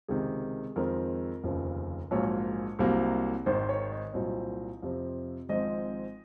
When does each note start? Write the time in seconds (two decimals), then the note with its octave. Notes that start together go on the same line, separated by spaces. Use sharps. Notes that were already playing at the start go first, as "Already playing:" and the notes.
0.08 C#2 C3 D#3 G#4
0.76 F2 D#3 G#3 C4 A#4
1.43 F1 D#2 C#3 F3
2.11 A#1 G#2 F#3 A#3 C#5
2.79 C2 C3 F#3 A#3
3.46 G#1 G#2 D#3 C5
3.69 C#5
3.92 D#5
4.14 C2 A#2 F#3 C4
4.83 F2 C3 F3 C4
5.49 G#1 G#2 F3 C4 D#5